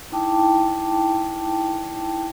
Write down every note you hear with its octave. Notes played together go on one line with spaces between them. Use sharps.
D#4 E4 G5 A5 D6